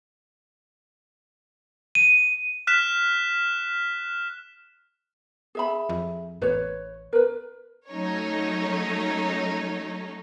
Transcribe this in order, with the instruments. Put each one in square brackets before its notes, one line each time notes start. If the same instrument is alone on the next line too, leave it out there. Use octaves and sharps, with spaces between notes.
[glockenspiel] D#7
[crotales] F6 F#6 B6 E7
[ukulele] G#4 E5 B5
[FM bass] F2
[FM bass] A1 [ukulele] B4 C#5
[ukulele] A#4 B4
[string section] F#3 A3 C#4 D#4 C#5